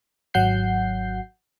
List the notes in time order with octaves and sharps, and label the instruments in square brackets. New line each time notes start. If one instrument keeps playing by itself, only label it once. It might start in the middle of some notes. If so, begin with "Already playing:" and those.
[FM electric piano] G#1 F#3 F#5 G6 C7